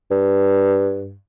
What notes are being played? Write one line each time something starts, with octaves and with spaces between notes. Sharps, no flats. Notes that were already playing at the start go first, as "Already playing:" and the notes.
G2